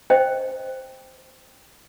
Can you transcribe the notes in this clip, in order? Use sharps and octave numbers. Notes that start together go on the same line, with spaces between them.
C5 D#5 G5